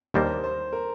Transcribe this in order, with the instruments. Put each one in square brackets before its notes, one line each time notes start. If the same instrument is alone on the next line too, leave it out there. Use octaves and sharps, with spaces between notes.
[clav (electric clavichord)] D#2 D#3 G3 A#3 D4 [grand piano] C5
[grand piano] C5
A#4